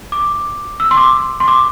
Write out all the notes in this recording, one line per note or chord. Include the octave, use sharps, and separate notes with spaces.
D6
E6
C6
D6
C6
D6